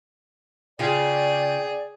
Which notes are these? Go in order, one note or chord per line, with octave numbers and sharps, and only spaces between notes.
C#3 F4 G#4 D5 G5